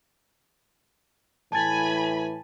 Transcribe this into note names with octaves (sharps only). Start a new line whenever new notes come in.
A2 E3 G#5 A5 B5 A6